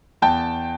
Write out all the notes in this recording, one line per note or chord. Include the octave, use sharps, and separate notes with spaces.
E2 G5 A5